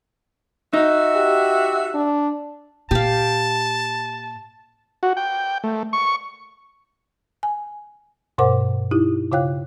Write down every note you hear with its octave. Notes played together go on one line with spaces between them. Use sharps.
D#4 F#4 E5
G4
D4
A#2 G4 F5 A5
F#4
G5
A3
C#6
G#5
G2 B2 A#4 C5 F#5 D6
D#4 E4 G4
C#3 F4 C#5 F5 G5 F#6